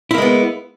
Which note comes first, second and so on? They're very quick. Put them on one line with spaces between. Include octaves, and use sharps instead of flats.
E4 A#3 G#3 B3